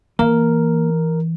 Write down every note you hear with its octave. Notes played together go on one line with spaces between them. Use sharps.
E3 A#3 A#4